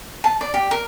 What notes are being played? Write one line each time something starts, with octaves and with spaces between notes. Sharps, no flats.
A5
D5
G4
A#4